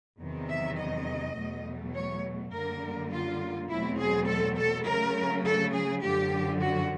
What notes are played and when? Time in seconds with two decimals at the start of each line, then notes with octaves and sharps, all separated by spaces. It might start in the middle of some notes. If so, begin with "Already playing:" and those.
0.19 E2 C3 D#3 F#3
0.48 E5
0.77 D#5
1.36 E2 B2 F#3 A3
1.94 C#5
2.53 F#2 D3 G3 A#3 A#4
3.11 F4
3.69 E2 B2 F#3 A3 C4 E4
3.99 G#4
4.27 A4
4.57 A4
4.86 C#3 F#3 A3 A#4
5.45 A4
5.73 G#4
6.03 F#2 D3 F3 G4
6.61 F#4